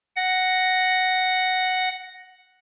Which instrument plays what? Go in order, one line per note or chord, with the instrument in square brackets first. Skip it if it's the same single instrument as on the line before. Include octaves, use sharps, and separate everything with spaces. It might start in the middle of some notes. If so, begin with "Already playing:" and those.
[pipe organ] F#5 A#6